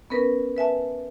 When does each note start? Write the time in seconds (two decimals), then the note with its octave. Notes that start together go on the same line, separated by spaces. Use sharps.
0.10 B3 C#4 A#4 B4
0.57 B4 E5 G#5 A5